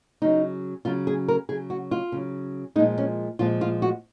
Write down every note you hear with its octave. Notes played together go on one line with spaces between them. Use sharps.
C#3 F#3 D#4
C#3 F#3 F4
G#4
A#4
C#3 F#3 G#4
F#4
F4
C#3 F#3
A#2 F3 G#3 D#4
C#4
A#2 F3 G#3 F4
F4
F#4